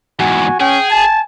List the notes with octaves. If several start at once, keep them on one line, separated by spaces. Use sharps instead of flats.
E2 G#2 F#4 G#5
C#4 G#4 G5
G#5 A5